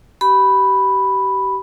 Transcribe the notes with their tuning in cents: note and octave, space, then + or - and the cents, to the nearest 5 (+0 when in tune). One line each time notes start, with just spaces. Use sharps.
G4 -30 B5 +0